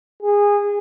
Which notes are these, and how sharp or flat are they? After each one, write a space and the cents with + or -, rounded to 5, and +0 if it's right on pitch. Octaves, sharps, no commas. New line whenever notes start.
G#4 -20